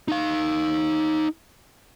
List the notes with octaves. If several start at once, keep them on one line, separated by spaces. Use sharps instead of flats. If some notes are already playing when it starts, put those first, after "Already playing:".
D#4 F5